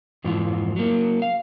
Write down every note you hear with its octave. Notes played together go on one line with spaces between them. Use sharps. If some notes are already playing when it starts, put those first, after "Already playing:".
F2 G#2 E3 F3
F#3 A#3
F5